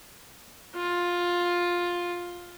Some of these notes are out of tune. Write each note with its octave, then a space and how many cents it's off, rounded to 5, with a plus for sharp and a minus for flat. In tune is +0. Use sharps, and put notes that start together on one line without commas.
F4 +10